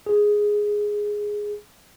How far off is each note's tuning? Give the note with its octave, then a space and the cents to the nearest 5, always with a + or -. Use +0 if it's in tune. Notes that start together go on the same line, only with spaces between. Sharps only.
G#4 +0